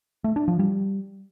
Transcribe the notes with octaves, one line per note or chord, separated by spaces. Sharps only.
A3
D4
F3
G3